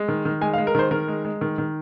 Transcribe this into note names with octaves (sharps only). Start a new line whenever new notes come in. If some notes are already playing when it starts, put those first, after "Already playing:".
Already playing: G#3
D#3
D#3
G#3 G#5
F5
G#3
A#4
D#3 C5
D#3 A#4
G#3
G#3
D#3
D#3